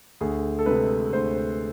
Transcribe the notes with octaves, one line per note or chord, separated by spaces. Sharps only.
D2 G#4
A4
C3 G#3 B4
D2 C5